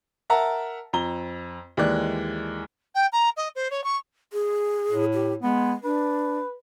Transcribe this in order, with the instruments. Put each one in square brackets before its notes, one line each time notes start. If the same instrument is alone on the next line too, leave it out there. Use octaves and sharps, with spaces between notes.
[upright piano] A#4 E5 F#5 A5 A#5
F2 A#5 G7
D#2 E3 G#3 D5 F#6
[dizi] G5
A#5
D#5
C5
C#5
C#6
[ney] G#4
[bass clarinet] A2
[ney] G4
[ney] G#3 [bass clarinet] B3
[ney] D4 [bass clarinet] B4